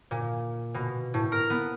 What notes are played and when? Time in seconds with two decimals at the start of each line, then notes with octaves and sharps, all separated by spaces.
0.11 A#2
0.74 B2
1.14 A2
1.32 A#4
1.50 B3